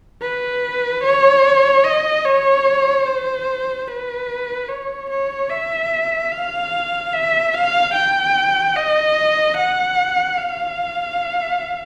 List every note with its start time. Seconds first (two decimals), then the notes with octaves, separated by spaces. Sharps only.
0.21 B4
1.03 C#5
1.84 D#5
2.25 C#5
3.06 C5
3.88 B4
4.69 C#5
5.10 C#5
5.50 E5
6.31 F5
7.13 E5
7.54 F5
7.94 G5
8.76 D#5
9.57 F#5
10.38 F5